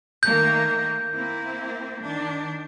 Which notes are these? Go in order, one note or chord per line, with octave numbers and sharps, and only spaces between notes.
D#3 A3 A#3 G6
A#3 C4 E4
D#3 D4